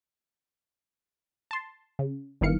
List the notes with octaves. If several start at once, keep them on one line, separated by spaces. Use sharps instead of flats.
A5 C6
C#3
G1 D#3 E3 F5 C#7